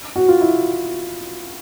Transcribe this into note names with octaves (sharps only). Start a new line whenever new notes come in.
F#4
F4
E4